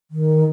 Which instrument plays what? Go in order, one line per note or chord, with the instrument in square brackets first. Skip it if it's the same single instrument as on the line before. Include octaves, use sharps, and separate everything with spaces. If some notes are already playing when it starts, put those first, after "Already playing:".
[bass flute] D#3